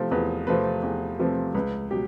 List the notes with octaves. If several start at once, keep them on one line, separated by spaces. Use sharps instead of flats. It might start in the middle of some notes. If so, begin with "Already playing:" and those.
Already playing: C3 F3 A3 C4
E2 B4
C3 F3 A3 C4 B4
E2
C3 F3 A3 C4 B4
C#2 B4
B2 F#3 G4